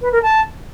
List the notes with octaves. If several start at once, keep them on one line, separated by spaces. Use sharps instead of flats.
B4
A#4
A5